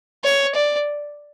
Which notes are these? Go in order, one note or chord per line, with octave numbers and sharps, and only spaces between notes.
C#5
D5